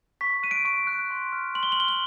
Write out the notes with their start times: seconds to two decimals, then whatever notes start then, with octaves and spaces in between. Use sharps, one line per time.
0.21 C#6 B6
0.43 F#6 D#7
0.51 D7
0.65 C#6 D7
0.87 F#6
1.11 C6
1.32 F6
1.55 C6 F#7
1.63 G7
1.72 F#7
1.77 F6 G7
1.88 F#7